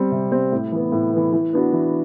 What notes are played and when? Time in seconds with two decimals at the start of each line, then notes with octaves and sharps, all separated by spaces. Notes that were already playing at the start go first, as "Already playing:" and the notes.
Already playing: G3 C4
0.12 C3
0.32 G3 C4
0.52 A2
0.72 E3 B3
0.92 A2
1.13 E3 B3
1.33 E3
1.53 B3 D4 F#4
1.73 E3